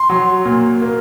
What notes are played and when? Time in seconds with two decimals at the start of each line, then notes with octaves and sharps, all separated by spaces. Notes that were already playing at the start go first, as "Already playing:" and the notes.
Already playing: C6
0.09 F#3
0.45 A#2
0.82 A#3